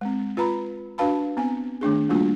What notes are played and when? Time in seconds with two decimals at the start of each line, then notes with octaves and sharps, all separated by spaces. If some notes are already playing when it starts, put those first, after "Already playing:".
0.01 G#3 C4
0.37 F4 B4 A#5 B5
0.98 D4 F#4 B4 F5 A5 B5
1.37 B3 C4 G#5
1.81 D#3 A3 D4 G#4
2.09 G3 A3 A#3 D4 F4 F#4